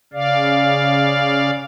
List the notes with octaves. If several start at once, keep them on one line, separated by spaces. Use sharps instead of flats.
C#3 D5 F5